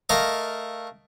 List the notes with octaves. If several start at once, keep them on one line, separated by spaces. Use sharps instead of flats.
A3 A#4 D#5 F5